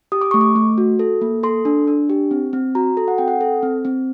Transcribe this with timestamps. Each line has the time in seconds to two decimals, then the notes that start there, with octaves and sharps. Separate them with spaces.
0.12 G4 D#6
0.21 D6
0.31 A3 C#6
0.41 D6
0.56 A3
0.78 F#4
0.99 A4
1.21 A#3
1.43 A4 C6
1.65 D4
1.87 D4
2.10 G4
2.31 C4
2.53 C4
2.75 F#4 A#5
2.97 A4
3.08 F#5
3.18 C4 G5
3.28 F#5
3.41 A4
3.63 C4
3.85 C4